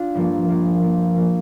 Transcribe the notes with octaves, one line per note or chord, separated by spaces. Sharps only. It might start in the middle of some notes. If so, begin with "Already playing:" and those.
Already playing: D4 F4
G2 F3 A#3
G2 F3 A#3
G2 F3 A#3
F3 A#3